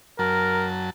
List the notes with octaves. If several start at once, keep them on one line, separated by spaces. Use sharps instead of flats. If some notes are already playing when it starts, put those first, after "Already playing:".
F#2 F#3 A#4 A5